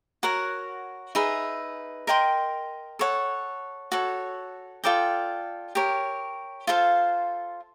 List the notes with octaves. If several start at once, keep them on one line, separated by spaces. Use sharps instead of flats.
F#4 A#4 C#5 F#5
D#4 G#4 B4 E5
A#4 D#5 G5 C6
A4 C#5 F#5
F#4 A4 C#5
F4 A4 D5 G5
G4 A#4 C#5
F4 A4 C5 F5